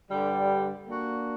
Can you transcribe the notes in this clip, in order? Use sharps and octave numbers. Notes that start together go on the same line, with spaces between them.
G2 D3 G3
A#3 D4 F#4